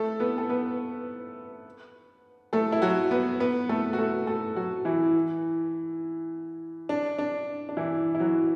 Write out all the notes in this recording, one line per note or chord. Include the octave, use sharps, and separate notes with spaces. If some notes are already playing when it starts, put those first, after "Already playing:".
Already playing: A3 A4
B3 B4
A4
B3 B4
A3 A4
E4
F#3 F#4
B3 B4
B3 B4
A3 A4
F#4
A3 A4
A3 A4
F#3 F#4
E3 E4
D4
D4
D4
E3 E4
E4
F#3 F#4